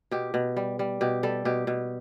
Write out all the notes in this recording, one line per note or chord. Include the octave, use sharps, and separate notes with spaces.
B2 G4
B2
G3
G3
B2 G4
G3 A4
B2 G4
B2